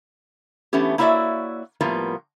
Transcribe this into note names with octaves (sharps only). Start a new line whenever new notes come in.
E3 A3 B3 C#4 G4
A#3 E4 F#4 C#5 D5 E5
A2 F3 G3 A#3 B3